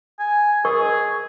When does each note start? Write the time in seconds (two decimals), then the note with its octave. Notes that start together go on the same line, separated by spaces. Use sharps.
0.19 G#5
0.65 G#4 A#4 D#5 C#6